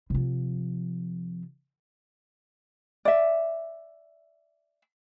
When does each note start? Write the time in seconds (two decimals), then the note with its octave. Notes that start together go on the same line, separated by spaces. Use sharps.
0.10 C3 F3
3.05 D5 E5